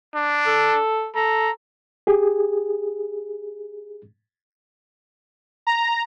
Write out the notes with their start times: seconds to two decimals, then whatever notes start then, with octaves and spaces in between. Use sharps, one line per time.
0.15 D4
0.46 A4
1.15 A4 A#5
2.07 G4 G#4
5.67 A#5